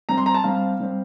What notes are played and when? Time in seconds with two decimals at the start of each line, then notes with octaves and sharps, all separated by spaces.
0.09 C3 G3 C4 A#5
0.17 C6
0.26 A#5
0.34 A5
0.43 C3 G3 C4 F5
0.79 C3 G3 C4